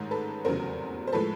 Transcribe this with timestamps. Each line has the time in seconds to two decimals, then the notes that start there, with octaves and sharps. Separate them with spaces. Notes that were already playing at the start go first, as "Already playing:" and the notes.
Already playing: A1 G#2 D#3 G#3
0.11 A4 B4
0.45 F1 E2 C#3 F#3 A#4 C5
1.07 C5
1.13 A2 F3 G#3 A4 B4